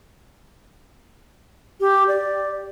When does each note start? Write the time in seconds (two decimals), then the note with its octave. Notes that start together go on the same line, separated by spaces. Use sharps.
1.80 G4
2.08 D5